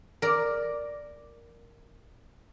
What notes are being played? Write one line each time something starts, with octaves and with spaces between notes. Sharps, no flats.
A#4 D5